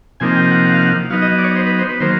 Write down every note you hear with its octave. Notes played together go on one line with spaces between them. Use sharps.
C3 F3 A#3 D#4 G#5
G5
F#5
F#5
F5
F#5
F#3 B3 D#4 F5
D#5
D5
C#5
C5
B4
C5
B4
D#3 F#3 A#3 C5